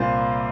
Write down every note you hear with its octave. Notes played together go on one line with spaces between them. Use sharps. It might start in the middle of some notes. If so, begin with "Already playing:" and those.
Already playing: C2 A#2 A#3 F4 C5